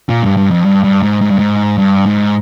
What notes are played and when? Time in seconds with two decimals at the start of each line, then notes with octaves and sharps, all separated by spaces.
0.09 A#2
0.23 G2
0.37 G2
0.51 F2
0.65 G2
0.84 G2
1.02 G#2
1.21 G#2
1.30 G2
1.39 G#2
1.78 G2
2.06 G#2